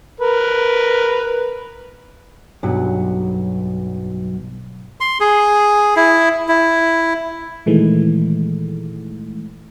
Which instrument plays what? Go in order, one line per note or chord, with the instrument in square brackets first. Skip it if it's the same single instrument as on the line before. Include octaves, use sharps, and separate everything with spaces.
[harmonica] A#4 B4
[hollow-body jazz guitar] B1 G2 F#3
[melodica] C6
G#4
E4
E4
[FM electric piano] A#2 D#3 E3 G#3 A3